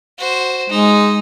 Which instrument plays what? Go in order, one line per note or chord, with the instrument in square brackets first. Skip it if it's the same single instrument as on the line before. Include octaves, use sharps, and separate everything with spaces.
[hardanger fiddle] F#4 C5
[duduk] G#3 [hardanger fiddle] D#4